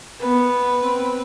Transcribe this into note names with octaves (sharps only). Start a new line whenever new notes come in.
B3 B4
C4